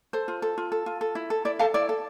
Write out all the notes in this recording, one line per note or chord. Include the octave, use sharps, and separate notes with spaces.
A4 C5
F4
A4
F4
A4
F4
A4
E4
A4
E4 D5
A4 F5 A5
E4 D5
A4